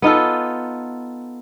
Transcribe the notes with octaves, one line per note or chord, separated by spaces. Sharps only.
B3 D#4 F4 A4